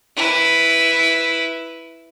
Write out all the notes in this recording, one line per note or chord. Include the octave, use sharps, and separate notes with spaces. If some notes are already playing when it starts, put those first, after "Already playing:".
E4 B4